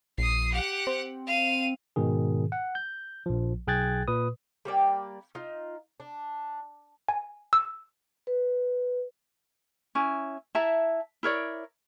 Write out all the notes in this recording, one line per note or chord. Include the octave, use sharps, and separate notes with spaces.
A#1 D#6 C7
G4 F#5
C4
F5 D#7
G#2 B2 D#3 G#4
F#5
G6
A#1 F3
B1 G#4 G5 F#6 G#6 A6
A#2 B4 D#6
G3 A#3 D5 G5
D#4 F4
D4
G#5
E6
B4
C#4 E4 G#5
E4 E5 A5 A#5
E4 A#4 C#5 D5